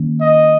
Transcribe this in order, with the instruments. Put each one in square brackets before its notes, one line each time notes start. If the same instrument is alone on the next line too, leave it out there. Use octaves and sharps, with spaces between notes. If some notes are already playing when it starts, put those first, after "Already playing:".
Already playing: [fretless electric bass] D#3 A#3 C#4
[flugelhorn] D#5